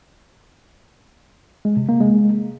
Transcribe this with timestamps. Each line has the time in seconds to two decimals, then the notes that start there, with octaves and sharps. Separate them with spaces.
1.65 G#3
1.77 C3
1.89 A#3
2.01 G#3